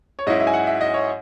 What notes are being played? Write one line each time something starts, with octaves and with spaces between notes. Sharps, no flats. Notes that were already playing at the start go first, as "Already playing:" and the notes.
C#5
G#2 F#3 C#4 E4 D#5
E5
G#5
F#5
E5
D#5
C#5